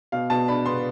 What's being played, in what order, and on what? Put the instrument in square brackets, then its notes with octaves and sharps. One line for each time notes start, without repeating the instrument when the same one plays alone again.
[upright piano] B2 F5
B2 A5
D4 B5
B3 C6